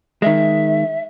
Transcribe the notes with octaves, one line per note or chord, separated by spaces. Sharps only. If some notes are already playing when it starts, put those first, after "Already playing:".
D#3 G#3 E5